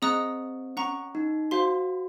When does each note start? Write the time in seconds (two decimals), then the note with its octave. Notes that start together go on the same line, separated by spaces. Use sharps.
0.02 C4 G#4 D#5 A#5 D#6 F#6
0.77 C#4 F#5 A#5 C#6
1.15 D#4
1.51 F#4 C5 F5 C6